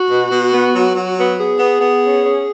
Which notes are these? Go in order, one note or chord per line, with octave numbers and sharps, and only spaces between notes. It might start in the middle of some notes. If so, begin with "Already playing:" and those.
Already playing: F#4
B2
B2
B3
F#3
F#3
B3
B3 G#4
B3
B3
C#4
C#4